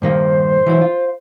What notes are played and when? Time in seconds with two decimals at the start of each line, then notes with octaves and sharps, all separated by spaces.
0.02 G2 D#3 A#3 C5
0.66 E3 F#3 E4
0.81 F4